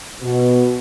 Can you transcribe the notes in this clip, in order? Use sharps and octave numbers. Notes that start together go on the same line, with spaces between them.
B2